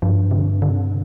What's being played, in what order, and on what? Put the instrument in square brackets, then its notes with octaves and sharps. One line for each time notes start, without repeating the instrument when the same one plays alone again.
[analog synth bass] G2 [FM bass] F3
[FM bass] C3
D3
D3
C3